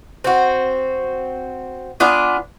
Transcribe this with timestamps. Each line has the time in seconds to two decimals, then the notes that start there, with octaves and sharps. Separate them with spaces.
0.24 C4 F#4
2.00 B3 D4 F4 G#5